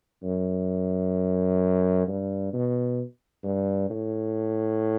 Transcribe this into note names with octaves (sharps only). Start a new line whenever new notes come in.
F#2
G2
B2
G2
A2